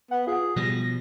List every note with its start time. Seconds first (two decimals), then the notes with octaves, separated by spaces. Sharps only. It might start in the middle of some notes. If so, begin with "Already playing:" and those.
0.11 B3 F#5
0.27 F4 G#4
0.56 B2 F3 G3 A#6